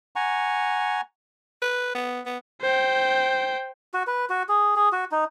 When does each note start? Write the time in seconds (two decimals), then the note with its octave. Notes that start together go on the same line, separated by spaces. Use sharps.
0.16 F#5 G#5 A#5 C#6
1.62 B4
1.95 B3
2.26 B3
2.61 C5 G5
3.94 F#4
4.07 B4
4.30 F#4
4.49 G#4
4.76 G#4
4.92 F#4
5.12 D#4